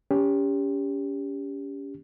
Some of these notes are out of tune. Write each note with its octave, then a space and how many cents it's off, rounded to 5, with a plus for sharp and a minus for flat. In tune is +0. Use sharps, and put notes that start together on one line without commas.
C#4 +30 G4 +15